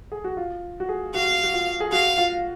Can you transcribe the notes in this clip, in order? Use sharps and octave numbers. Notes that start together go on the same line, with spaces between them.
G#4
F#4
F4
F#4
G#4
F#4 F5
F#4
F4
G#4
F#4 F5
F4